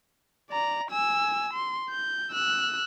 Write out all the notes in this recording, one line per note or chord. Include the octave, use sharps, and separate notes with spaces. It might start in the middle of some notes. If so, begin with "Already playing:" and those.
D5 A#5
G#5 E6
C6
G6
E6 F#6